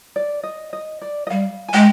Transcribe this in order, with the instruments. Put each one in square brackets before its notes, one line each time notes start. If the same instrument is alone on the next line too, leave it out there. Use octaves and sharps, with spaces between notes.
[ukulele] D5
D#5
D#5
D5
D#5
[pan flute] G3 [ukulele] F5
[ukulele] G#5
[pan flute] G#3 [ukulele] G5